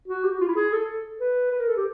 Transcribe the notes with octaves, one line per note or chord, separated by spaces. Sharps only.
F#4
G4
F#4
F4
E4
G#4
A4
B4
B4
A#4
A4
G4